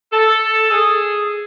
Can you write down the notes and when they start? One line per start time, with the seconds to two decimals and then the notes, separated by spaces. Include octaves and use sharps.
0.12 A4
0.71 G#4